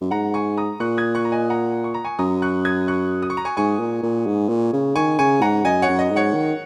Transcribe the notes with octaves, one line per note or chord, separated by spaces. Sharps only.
F#2
G#2 F#5 A#5
G#5 C#6
A#5 D#6
A#2 C#6 F#6
D#6 G#6
C#6 F#6
A#5
D#5 G#5
F#5 A#5
C#6
A#5
G#5 C#6
F#2 A#5 D#6
C#6 F#6
D#6 G#6
C#6 F#6
D#6
C#6
A#5
G#5 C#6
G#2 G#5 C#6
A#2
A#2
G#2
A#2
C#3
D#3 G#5 C#6
C#3 G#5 C#6
G#2 F#5 A#5
F#2 D#5 G#5
C#5 F#5
F#2
D#5
G#2
C#5 F#5
D#3